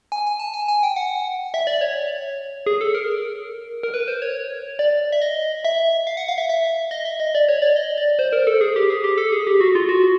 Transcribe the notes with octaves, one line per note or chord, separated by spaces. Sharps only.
G#5
G#5
A5
G#5
G#5
G5
F#5
E5
D5
C#5
G#4
A4
A#4
A#4
B4
C5
C#5
D5
E5
D#5
E5
F5
F#5
F5
E5
E5
D#5
E5
D#5
D5
C#5
D5
D#5
D5
C5
A#4
A4
G#4
G4
G#4
G4
A4
G#4
G4
F#4
F4
F#4